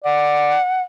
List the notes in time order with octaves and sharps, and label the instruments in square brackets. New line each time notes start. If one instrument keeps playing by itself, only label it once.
[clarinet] D5 [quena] F#5